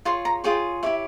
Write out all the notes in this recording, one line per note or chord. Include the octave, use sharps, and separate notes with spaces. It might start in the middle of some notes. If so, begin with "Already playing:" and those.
F4 G#4 C#5 C6
A#5
F4 G#4 C#5 G5
E4 G4 C#5 E5